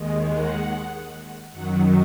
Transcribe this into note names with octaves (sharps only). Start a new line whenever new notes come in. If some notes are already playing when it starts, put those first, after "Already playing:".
Already playing: D#2 D#3 G#3
F#5
F#2 D#3 F#3 F#5